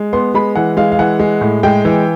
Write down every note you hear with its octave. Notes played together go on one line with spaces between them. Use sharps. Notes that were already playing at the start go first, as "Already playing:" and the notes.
Already playing: G#3
B3 C6
G#3 B5
E3 F#5
G#3 F5
F5
E3 F#5
G#3
A2
G#3 G5
E3